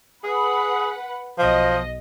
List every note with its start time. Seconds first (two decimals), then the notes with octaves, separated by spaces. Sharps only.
0.24 G#4 B4 F#5 B5
1.39 B1 F3 D#5